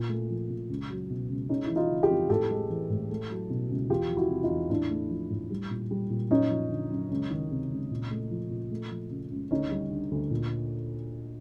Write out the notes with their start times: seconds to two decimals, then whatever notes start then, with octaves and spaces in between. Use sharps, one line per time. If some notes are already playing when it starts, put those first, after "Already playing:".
Already playing: A#2
0.09 A3
0.30 F3
0.50 A#2
0.69 C#2
0.90 F#3
1.10 B2
1.30 C#2
1.49 G#3 C#4 D#4
1.65 E4
1.70 E3
1.76 D#4 F4
1.90 C#3
2.03 F4 G4
2.10 F2
2.29 A2 G4 A4
2.50 G#3
2.70 E3
2.90 A2
3.10 A3
3.30 F#3
3.50 B2
3.70 C#2
3.90 E2 F4 G4
4.10 F3
4.17 E4 F#4
4.30 C3
4.43 D#4 F4
4.51 E2
4.70 A2 D4 E4
4.90 A3
5.10 F3
5.30 A2
5.50 G3
5.71 A#2
5.91 G3
6.10 A#2
6.31 F#2 C#4 D#4
6.51 F3
6.70 D3
6.91 F#2
7.11 C#2
7.30 D#3
7.51 C3
7.71 C#2
7.91 A#2
8.11 A3
8.31 F3
8.51 A#2
8.71 A3
8.91 F3
9.10 C#3
9.31 C#2
9.51 D2 C#4 D#4
9.71 G3
9.91 D3
10.11 D2
10.31 A#2